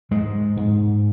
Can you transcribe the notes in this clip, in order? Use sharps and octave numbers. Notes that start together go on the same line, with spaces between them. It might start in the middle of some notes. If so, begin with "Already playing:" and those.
G#2 G#3
G#2